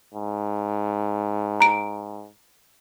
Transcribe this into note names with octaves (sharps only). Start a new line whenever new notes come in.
G#2
A#5 D7